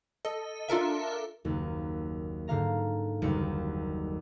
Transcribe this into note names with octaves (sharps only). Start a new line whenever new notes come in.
A4 D#5
D4 F4 A4 A#4 E5
F#1 D#2
G#2 D3 F5 A#5
F#1 D#2 G3 C#7